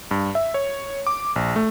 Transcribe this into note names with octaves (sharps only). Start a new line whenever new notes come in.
G2
E5
C#5
D6
A#1
A3